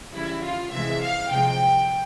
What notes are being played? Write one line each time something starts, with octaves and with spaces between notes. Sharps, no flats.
C#3 E3 G3 E4
F4
C3 E3 G#3 E5
F5
C3 F3 G#3 G5